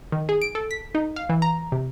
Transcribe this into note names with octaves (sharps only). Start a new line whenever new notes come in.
D#3
G#4
D7
A4
B6
D#4
F5
E3
A#5
C3